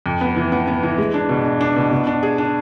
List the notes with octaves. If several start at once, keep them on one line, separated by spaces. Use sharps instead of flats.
F2
B3
E3
B3
B3
E3
G#3
D4
B2
D4
D4
B2
B2
D4
G#4
D4